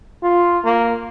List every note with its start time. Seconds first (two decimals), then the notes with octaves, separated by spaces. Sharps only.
0.23 F4
0.64 A#3